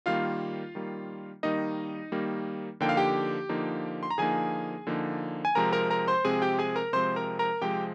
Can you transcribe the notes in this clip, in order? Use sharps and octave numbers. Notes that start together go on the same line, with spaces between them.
D#3 G3 A#3 F4 F5
D#3 G3 A#3
D#3 G3 A#3 D#4 D#5
D#3 G3 A#3
D3 F3 A#3 D#4 G5
F5
G4 G5
D3 F3 A#3 D#4
C6
A#5
D3 F3 A#3 D#4 G#4 G#5
D3 F3 A#3 D#4
G#5
C3 F3 G#3 C4 A#4 A#5
A#4 A#5
A#4 A#5
C5 C6
C3 F3 G#3 C4 G#4 G#5
G4 G5
G#4 G#5
A#4 A#5
C3 F3 G#3 C4 C5 C6
A#4 A#5
A#4 A#5
C3 F3 G#3 C4 G4 G5